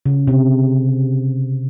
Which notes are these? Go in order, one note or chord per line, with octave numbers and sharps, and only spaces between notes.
C#3
C3